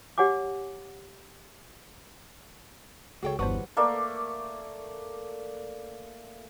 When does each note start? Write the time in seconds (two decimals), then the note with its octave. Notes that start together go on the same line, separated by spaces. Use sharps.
0.18 G4 C#5 F#5 G#5 D6
3.23 C#2 F#4 G#4 A4 C#5 G5
3.39 G1 E2 G3 B4 C5 F#5 A5 C#6
3.77 A3 A#3 D5